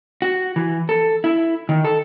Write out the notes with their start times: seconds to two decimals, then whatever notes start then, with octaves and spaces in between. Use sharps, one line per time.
0.22 F#4
0.56 E3
0.89 A4
1.24 E4
1.69 D#3
1.85 A4